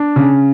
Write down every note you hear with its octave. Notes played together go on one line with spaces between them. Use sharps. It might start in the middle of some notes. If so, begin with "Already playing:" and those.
Already playing: D4
C#3